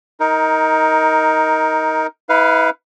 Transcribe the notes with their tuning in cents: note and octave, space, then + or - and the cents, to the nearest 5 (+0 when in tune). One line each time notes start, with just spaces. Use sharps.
D#4 +15 A#4 +0
E4 -40 B4 +10 F5 +0